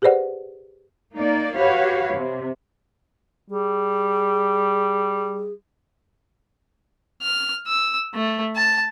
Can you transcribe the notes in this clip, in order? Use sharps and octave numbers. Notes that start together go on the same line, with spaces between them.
G4 G#4 B4 C5 D5 F#5
A#3 D#4 D5
F#4 G4 B4 C#5 F5
C3
G3 G#4
F6
E6
A3
A5